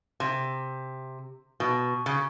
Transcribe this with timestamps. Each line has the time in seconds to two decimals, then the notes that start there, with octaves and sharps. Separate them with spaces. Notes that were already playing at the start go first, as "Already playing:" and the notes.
0.20 C3
1.60 B2
2.06 C#3